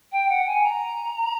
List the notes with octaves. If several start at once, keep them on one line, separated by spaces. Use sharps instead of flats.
G5
F#5
G#5
A#5